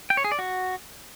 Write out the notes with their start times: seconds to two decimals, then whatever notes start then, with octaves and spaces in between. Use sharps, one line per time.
0.10 G5
0.17 C#5
0.24 G#4
0.32 D5
0.39 F#4